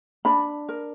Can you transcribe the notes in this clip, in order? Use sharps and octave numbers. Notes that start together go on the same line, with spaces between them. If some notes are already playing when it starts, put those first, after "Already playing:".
D4 B5
A#4